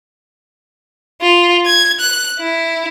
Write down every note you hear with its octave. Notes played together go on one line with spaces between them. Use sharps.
F4
G#6
F#6
E4